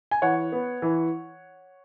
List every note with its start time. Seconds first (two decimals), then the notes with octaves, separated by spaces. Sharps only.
0.11 G#5
0.22 E3 C#5 F#5
0.52 B3
0.82 E3